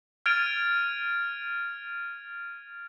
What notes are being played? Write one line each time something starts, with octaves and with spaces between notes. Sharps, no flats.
F6 G#6 A6 D7 D#7 F7